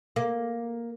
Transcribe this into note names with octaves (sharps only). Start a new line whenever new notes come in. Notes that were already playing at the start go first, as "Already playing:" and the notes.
A#3